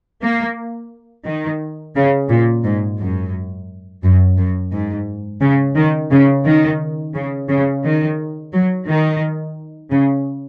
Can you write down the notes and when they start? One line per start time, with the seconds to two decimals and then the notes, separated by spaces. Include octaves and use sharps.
0.22 A#3
1.26 D#3
1.95 C#3
2.30 A#2
2.64 G#2
3.00 F#2
4.03 F#2
4.38 F#2
4.72 G#2
5.41 C#3
5.76 D#3
6.11 C#3
6.45 D#3
7.14 C#3
7.49 C#3
7.84 D#3
8.53 F#3
8.88 D#3
9.91 C#3